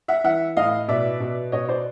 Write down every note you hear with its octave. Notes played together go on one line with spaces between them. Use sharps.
E5 F#5
E3 E5 F#5
A2 D#5 F5
B2 D5 E5
B2
B2 C#5 D#5
C5 D5